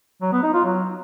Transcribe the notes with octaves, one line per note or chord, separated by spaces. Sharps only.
F#3
B3
D#4
F4
F#3